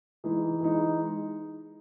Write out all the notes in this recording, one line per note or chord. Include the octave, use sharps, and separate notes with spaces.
E3 G#3 D#4
E3 G#3 D#4